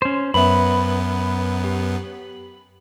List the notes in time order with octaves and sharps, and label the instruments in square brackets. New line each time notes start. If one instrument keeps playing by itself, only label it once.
[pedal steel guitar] C#4 C5
[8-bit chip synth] F#2 B3 [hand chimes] B4 C5 E5 [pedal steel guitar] B5
[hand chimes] G4